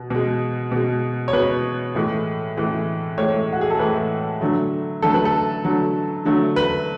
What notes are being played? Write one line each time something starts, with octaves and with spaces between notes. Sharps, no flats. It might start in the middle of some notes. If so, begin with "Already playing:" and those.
Already playing: B2
B2 G#3
B2 G#3
C#5
B2 G#3 B4
A2 E3 G#3
A2 E3 G#3
A2 E3 G#3 C#5
F#4
G#4
A4
A2 E3 G#3 B4
D3 F#3 A3
D3 F#3 A3 A4
B4
A4
D3 F#3 A3
D3 F#3 A3
B4